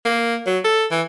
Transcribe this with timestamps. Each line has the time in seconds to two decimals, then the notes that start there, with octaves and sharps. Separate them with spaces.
0.05 A#3
0.46 F#3
0.64 A4
0.92 E3